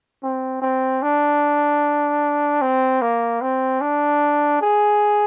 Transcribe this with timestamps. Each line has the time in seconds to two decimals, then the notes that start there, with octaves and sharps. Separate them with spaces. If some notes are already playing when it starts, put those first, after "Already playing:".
0.23 C4
0.62 C4
1.03 D4
2.62 C4
3.02 A#3
3.42 C4
3.81 D4
4.61 G#4